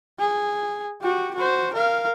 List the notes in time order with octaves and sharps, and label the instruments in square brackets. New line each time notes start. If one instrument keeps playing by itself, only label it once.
[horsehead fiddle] G#4
F#4 G4
F#4 C5
A#4 F5